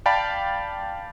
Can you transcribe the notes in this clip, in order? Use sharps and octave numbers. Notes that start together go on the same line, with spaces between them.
D5 F5 G5 A5 B5